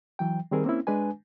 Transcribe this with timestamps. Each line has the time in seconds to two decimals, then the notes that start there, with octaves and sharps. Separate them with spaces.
0.19 E3 F#3 G5
0.51 D#3 G3 C4 G#4 A#4
0.65 A#3 C4 C#4 E4
0.87 G#3 D4 B4 G#5